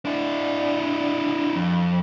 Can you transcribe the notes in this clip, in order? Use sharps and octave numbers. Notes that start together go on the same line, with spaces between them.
D4 E4
F2